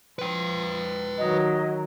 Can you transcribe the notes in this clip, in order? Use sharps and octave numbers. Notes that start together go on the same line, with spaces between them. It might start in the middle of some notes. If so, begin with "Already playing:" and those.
F3 B4 G5
D#3 F#3 D#5